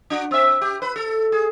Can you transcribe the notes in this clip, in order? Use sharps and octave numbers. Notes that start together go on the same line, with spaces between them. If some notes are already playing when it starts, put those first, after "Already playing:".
D4 F#4
C4 E5
G4
B4
A4
G#4